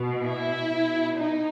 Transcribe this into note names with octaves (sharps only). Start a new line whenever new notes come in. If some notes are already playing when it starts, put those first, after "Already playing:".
Already playing: B2
E4
B2
D#4